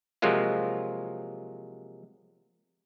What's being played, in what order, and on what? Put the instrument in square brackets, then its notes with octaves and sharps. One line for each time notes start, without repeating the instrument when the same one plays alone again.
[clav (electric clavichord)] C3 F3 F#3 G#3 A#3 F4